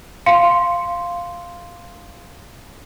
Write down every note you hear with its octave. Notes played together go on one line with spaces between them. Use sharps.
F5 C6 C#7